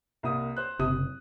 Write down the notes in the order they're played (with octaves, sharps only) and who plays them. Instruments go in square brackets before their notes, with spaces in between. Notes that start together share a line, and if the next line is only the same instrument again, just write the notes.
[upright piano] C2 A#3 D#6
C5 F#6
[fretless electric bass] F#1 [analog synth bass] C3 [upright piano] D#6